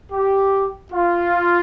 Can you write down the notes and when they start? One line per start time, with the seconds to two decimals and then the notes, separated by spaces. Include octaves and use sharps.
0.12 G4
0.93 F4